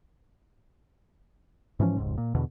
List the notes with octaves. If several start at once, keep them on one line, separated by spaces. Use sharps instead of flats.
G#2 E3 F3 C#4
F1 C#2 G#2
A#2
E2 B2 D3